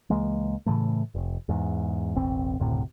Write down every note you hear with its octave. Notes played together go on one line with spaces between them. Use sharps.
C#2 E3 G#3 A#3
A2 C#3 E3 A3
F1
E2 G#2
E1 A1 C4
F#1 D2 A2 C3